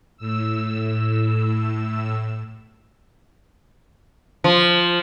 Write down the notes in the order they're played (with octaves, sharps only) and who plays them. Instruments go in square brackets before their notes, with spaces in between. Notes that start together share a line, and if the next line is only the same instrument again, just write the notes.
[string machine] A2 E6
[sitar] F3